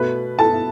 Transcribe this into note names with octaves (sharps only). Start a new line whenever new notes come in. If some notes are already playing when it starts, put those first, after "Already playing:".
Already playing: B2 A3 B4 B5
A4 A5